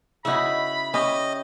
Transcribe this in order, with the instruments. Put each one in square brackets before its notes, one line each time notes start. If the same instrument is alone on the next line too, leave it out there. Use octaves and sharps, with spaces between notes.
[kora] C#3 D#4 [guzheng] E4 F#4 G#4 [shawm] B5
[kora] C#4 [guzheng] G4 [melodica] D#5